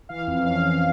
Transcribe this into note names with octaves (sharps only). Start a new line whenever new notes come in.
E3 F5
F2 F5
C#4 F5
F2 F5